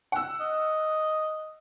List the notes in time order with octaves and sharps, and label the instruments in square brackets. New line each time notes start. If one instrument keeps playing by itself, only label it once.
[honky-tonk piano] F#5 E6
[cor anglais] D#5